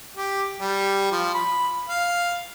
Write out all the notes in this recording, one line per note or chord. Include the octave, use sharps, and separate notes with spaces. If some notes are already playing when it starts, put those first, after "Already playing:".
G4
G3
F3
B5
F5